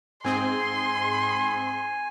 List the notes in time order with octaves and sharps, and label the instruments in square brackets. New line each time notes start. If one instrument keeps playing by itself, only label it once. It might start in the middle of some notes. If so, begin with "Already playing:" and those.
[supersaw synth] G#2 C4 G#4 [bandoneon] G#5 [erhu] C6